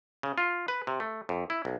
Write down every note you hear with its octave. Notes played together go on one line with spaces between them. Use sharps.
C#3
F4
B4
C3
A3
F2
E4
B1